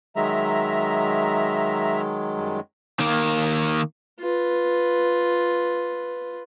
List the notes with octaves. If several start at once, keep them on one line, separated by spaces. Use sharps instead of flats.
D#3 F#3 G#3 E5 A#5
F#2 G3
D#3 A#3
F4 B4